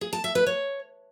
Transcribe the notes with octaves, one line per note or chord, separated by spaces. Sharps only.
G#4
A5
E5
B4
C#5